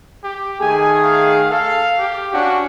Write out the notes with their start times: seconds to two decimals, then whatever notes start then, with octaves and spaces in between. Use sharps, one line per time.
0.24 G4
0.61 D#3 A3 G#4 G#5
1.04 F5
1.50 A4 F5
1.98 G4
2.34 C#4 D4 F#4